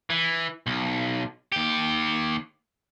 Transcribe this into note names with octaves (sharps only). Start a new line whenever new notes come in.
E3
B1
D#2 G4